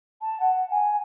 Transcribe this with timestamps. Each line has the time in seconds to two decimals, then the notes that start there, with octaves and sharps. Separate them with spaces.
0.21 A5
0.40 F#5
0.71 G#5